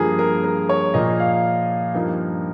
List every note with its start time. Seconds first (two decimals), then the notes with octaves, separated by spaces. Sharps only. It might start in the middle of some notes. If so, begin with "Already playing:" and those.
Already playing: G2 F3 A#3 G#4
0.19 A#4
0.44 A#4
0.69 C#5
0.94 A#2 F3 A#3 D#5
1.20 F5
1.94 G2 F3 A#3 D#4